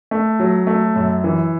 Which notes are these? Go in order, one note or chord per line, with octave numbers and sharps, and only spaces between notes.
A3
F#3
A3
F#2
E3